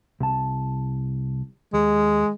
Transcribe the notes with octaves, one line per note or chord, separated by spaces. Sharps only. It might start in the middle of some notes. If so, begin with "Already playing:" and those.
C2 A5
D#2 G#3